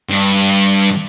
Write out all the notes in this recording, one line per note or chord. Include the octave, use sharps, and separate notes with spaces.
G2